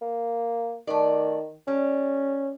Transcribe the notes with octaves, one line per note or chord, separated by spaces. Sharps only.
A#3
D#3 A3 D5
G3 C#4